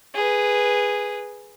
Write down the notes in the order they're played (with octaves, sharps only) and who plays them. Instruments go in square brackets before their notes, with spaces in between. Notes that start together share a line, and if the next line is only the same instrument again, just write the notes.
[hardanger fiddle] G#4 B4